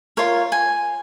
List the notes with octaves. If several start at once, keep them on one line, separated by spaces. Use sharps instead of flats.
F4 A#4 C#5
G#5